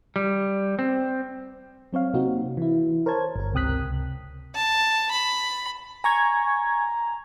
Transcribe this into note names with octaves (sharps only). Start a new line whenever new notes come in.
G3
C4
F#3 C4 C#5 F5
C3 A#3 C4 D#4 F#4
E3 E4
A#4 C5 C#5 A5 G#6
G1 A#4
C#2 C3 G5 D#6 F#6 B6
A5
B5
G#5 A#5 C#6 G#6